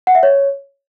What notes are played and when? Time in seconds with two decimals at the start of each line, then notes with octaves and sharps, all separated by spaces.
0.07 F#5
0.15 E5
0.23 C#5